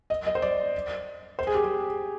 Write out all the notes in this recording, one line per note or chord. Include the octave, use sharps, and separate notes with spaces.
D#5
D#5
C5
D5
C5
G#4
G4
G#4